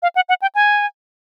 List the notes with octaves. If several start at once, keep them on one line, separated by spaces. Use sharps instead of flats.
F5
F#5
F#5
G5
G#5